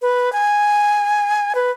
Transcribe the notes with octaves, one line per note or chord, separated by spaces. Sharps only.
B4
G#5
B4